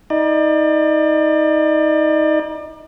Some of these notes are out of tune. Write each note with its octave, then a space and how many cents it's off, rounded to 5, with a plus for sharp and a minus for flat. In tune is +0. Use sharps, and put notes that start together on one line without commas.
D#4 +30 D5 +35